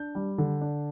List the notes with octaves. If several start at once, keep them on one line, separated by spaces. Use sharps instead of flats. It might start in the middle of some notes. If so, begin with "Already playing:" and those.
Already playing: D4 G6
G3
D3
D4